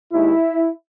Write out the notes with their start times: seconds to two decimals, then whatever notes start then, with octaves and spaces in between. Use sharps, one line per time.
0.12 D#2 D#3 G#3 E4